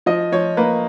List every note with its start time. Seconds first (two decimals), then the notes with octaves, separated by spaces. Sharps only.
0.06 F3 D#5
0.32 F3 C#5
0.57 A#3 B4